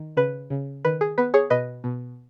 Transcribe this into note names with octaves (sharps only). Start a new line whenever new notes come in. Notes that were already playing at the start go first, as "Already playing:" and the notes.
Already playing: D#3
C#3 B4
C#3
D#3 B4
G#4
B3 B4
G#4 C#5
B2 B4 D#5
B2